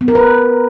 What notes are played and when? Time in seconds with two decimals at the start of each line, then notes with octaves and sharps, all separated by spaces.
0.01 B3
0.08 A#4
0.15 B4